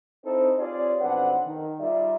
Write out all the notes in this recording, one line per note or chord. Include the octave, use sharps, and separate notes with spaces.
C4 D#4 E4 A4 C5
C4 F4 G4 G#4 C#5 D5
B1 F2 C4 D4 B4 F#5
D#3
G3 D#4 F4 G#4 D5 E5